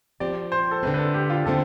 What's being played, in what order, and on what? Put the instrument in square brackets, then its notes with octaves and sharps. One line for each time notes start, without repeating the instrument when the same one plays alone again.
[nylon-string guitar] F3 C4 G4 [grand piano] D5
[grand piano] C5
A4
[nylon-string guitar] D3 A3 C4 [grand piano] B4
[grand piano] B4
A4
G4
F4
[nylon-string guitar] D3 A3 C4 [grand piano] A4